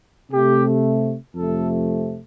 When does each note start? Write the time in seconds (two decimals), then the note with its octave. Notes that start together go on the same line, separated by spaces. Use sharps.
0.31 C3 A3 G4
1.35 F2 C3 A3 A4